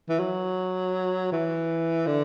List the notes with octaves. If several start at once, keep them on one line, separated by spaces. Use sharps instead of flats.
E3
F#3
E3
D3